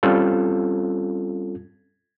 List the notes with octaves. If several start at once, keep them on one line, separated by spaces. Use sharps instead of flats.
G3 C4 C#4 F4 A4